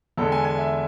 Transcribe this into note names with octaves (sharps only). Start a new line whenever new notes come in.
E2 D3 G#3 A4
G#5
G#5
E5